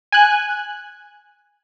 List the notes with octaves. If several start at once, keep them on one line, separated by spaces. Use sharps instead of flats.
G#5 F#6